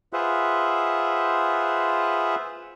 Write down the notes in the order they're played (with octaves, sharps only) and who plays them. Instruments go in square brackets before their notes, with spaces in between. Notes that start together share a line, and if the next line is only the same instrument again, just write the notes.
[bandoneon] F4 G#4 B4 C5 E5 F#5